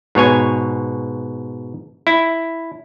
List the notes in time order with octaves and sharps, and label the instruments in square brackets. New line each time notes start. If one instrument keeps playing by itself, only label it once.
[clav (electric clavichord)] G#2 B2 C#5 G#5
E4